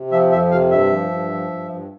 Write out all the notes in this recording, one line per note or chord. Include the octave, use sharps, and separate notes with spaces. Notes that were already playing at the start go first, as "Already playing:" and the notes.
Already playing: C3
F3 E5
F2 E5
C3 F5
G2 E5
F3
G2
F3
G2
G2